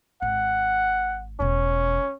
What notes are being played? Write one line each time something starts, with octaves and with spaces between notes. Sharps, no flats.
G#1 F#5
E1 B2 C#4